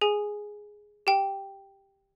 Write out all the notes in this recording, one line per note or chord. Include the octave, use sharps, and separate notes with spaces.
G#4 G#5
G4 G5